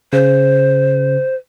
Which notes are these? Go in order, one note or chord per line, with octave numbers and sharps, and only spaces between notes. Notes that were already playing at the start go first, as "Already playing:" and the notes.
C#3 C5